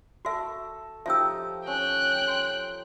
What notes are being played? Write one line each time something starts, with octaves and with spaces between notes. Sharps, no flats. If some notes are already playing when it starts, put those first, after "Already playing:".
F#4 A4 E5 C#6
F3 D#4 G4 E5 E6
C#4 G5 F#6
C6